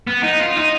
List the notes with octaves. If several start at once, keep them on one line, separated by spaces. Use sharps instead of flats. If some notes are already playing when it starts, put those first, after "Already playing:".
B3
D#4
F4
D#4